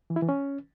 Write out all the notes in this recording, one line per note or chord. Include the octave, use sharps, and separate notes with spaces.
E3
E4
E3
C#4